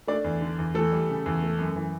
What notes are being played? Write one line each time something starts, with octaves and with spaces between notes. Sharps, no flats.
A3 D4 D5
E2
D3
E2
E3 A3 A4
G3
C#3
E2
A3
F#2
E3